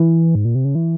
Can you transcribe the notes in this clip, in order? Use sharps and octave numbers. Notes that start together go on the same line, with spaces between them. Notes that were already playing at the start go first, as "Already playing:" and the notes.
Already playing: E3
G#2
A#2
C3
C#3
E3